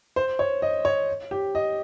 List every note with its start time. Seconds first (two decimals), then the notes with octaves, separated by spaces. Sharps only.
0.16 C5
0.39 C#5
0.62 D#5
0.85 C#5
1.31 G4
1.55 D#5